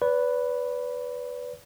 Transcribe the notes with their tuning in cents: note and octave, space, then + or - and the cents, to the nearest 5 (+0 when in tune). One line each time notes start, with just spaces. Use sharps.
B4 +0 D5 -35 B5 +0